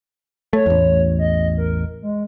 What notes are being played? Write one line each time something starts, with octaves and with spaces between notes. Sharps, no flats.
A3 C#5
A1 E2
D#5
A#4
G#3